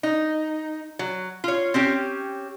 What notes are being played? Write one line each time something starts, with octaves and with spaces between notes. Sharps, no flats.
D#4
F#3
F4 C#5
C4 C#4 G4